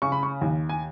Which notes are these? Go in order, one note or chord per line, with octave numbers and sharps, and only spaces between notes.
C#3 C#6
B5
C#6
D#2
G#5